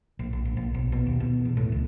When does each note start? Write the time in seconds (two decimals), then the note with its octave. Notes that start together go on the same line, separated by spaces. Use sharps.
0.19 A#1
0.33 A#1
0.45 A#1
0.57 A#1
0.74 B1
0.92 B2
1.06 D#2
1.20 B2
1.45 E2
1.57 A2
1.72 C#2